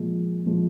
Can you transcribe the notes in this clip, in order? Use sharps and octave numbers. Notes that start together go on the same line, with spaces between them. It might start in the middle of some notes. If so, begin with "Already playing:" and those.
Already playing: A#2 F3 G#3
A#2 F3 G#3